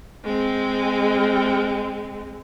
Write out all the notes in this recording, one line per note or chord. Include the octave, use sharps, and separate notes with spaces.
G#3 C4